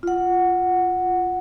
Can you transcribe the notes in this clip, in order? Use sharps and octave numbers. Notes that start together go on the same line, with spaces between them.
F4 F#5